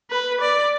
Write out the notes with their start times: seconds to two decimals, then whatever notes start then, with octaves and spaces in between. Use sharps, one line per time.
0.10 B4
0.41 D5